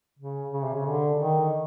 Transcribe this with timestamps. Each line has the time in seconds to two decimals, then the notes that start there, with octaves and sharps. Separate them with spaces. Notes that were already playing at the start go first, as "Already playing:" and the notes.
0.19 C#3
0.53 C#3
0.64 C3
0.75 C#3
0.86 D3
1.20 D#3